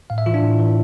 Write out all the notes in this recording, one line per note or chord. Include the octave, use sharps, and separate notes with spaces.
A2 F5
E5
E3 F4
D4
A2
E3